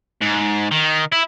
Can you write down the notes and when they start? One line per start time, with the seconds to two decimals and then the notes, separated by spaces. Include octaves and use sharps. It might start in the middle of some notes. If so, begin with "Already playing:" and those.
0.22 G#2
0.71 D#3
1.12 E4